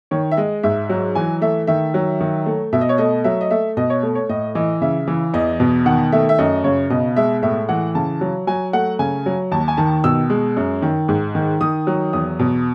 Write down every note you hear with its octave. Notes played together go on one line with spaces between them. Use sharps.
D#3 C#5
E5
G#3 D#5
G#2 E5
F#3
E3 G#5
A3 E5
D#3 E5
F#3
D#3
A3
B2 E5
D#5
C#5
A3 D#5
F#3 E5
D#5
A3 E5
B2 D#5
C#5
A3
C#5
A2 D#5
E3 D#5
C#3 E5
E3
E2 D#5
B2
D#3 F#5
A3 E5
E5
F#2 D#5
C#3 C#5
B2 D#5
G#3 E5
A2 E5
E3 F#5
C#3 A5
F#3
F#3 G#5
A3 F#5
C#3 G#5
F#3
D#2 A5
G#5
D#3 A5
B2 E6
G#3
F#2
D#3
G#2
D#3
D#3 D#6
F#3
E2 D#6
B2